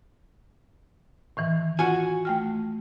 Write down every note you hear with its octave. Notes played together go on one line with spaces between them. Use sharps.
A2 D#3 E3
F4 F#4 G#5
A3 G5 F6